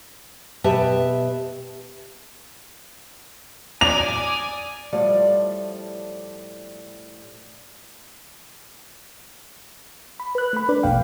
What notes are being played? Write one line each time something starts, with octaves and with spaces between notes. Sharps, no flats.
B2 G4 B4 E5 A5
D5 G#5 D#6 F7
A2 F3 G3 D5
B5
B4 F#6
A3 B5
D4 B4 D5
A#1 F2 B2 A3 F5 G5